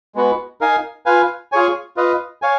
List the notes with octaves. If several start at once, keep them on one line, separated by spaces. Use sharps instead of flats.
G#3 B3 F#4 B4
D#4 A#4 F5 G#5
F4 B4 F5 G#5
F4 G#4 C#5 G#5
F4 B4 D#5
C#5 F5 G#5